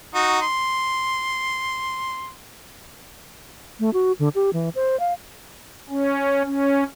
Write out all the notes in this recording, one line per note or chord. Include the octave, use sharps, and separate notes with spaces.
D#4 F#4
C6
A3
F#4
D3
G4
E3
C5
F5
C#4
C#4